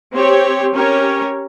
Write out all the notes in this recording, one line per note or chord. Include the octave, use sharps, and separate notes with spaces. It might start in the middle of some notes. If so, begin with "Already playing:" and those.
C4 G4 C#5
C#4 G4 A#4 C#5